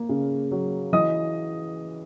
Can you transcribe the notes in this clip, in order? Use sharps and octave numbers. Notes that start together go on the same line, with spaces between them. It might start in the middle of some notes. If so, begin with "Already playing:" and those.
Already playing: A#3
C#3
F#3
E3 D#5 D#6